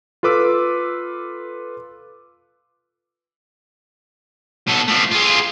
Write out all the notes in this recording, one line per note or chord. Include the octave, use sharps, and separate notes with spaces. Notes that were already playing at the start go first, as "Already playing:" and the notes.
F4 A4 B4 D6 E6
B2 A4
F3 A3
F4 G#4